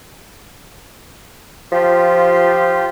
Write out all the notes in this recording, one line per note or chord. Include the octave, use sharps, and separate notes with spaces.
F3 F4 G4